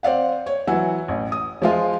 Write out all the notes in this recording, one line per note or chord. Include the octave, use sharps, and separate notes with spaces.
C4 D5 F5 F#5
C#5
E3 F#3 F#5 G#5 E6
A1
D#6
F3 G#3 F4